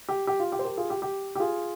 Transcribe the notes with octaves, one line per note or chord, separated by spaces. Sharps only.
G4
G4
F4
G4
C5
G4 A#4
F4 G#4
G4
G4
G4
F4 G#4